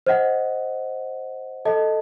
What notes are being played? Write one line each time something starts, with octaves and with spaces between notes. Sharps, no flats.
C5 D#5 F#5
A4 D#5 A5